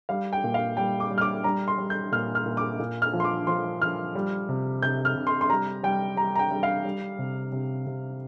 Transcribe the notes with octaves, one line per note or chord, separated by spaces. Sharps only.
G3 F5
G5
A#2
F5
G3 G5
D6
G3
F6
D6
G3 A#5
C6
G3
G6
A#2 F6
F6
A#2
D6
A#2
F6
F3
C6
D6
F3 C6
F3 F6
G3
C3
C3 G6
F6
C3
C6
C6
G3 A#5
G3 G5
G3 A#5
A#5
G5
G3
F5
G3
C3
C3
C3